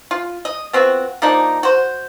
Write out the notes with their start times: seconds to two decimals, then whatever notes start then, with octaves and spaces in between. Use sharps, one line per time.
0.11 F4
0.45 D#5
0.73 B3 C4 F4 F#4
1.22 F3 A#3 D4 D#4
1.63 F#4 C5